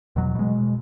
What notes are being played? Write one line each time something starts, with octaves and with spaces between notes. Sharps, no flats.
E2 B2 F#3
B2 G#3